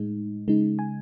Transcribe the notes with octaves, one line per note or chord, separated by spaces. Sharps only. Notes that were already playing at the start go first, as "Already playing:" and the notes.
Already playing: A2 G#3 D#4
C#3 G#3 D#4
G#5